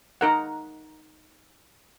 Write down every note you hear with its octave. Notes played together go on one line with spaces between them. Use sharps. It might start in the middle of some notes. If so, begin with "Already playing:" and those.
D#4 A#4 F#5